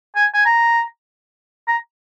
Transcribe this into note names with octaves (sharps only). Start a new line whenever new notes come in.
G#5
G#5
A#5
A#5